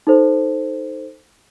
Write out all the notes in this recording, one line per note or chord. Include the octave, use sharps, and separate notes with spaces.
D#4 A4 C5